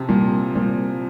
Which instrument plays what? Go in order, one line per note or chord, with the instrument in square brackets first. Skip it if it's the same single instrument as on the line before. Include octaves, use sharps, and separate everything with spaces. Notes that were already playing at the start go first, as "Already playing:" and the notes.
Already playing: [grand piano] C3 F3
[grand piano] A#2 [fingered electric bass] G3
[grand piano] A#2 [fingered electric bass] G3